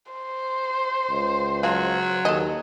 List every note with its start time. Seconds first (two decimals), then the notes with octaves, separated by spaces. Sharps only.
0.12 C5
1.11 C#2
1.63 F3 F#3 F4
2.25 D#2 A4 D#5